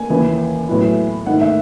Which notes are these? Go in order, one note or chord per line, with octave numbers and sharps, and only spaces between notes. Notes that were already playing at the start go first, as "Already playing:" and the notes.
Already playing: G#5
D#2 C#3 E3
A2 F#3 B3 E4
G#2 D#3 A3 D#4 F#5
E5